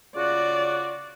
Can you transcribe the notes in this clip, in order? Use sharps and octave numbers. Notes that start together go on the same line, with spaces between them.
C#3 F4 F#4 D5